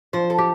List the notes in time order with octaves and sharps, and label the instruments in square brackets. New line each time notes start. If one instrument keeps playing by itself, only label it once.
[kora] F3 [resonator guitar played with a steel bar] C5
[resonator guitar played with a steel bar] A4
[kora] G4